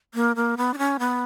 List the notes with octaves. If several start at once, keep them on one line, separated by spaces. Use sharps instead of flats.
A#3
A#3
B3
D4
C#4
B3